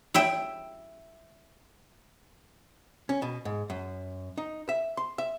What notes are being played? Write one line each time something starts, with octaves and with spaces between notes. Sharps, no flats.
E4 E5 G5
C#4
B2
G#2
F#2
D#4
E5
C6
E5